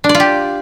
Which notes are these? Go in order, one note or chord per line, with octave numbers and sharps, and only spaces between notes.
D4
D5
F4
G4